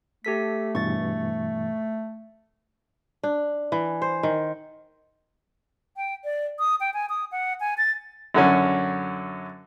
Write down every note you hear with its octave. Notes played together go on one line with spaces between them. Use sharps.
A3 G4 A4 B6
G2 B2 E3 C#6 A6
D4
E3
C5
D#3
G5
D5
D#6
G5
G#5
D#6
F#5
G#5
A6
F#2 D3 C#4